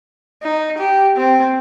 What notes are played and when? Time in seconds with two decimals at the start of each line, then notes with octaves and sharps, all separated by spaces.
0.43 D#4
0.78 G4
1.16 C4